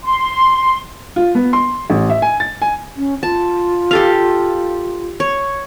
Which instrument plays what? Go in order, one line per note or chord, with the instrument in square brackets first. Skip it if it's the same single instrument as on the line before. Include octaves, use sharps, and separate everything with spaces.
[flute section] C6
[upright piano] F4
B3
C6
A1
E5
G#5
A6
G#5
[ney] C#4
[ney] F4 [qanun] A5
[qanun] G4 A4 F5
C#5